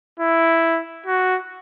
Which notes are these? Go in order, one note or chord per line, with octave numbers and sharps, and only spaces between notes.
E4
F#4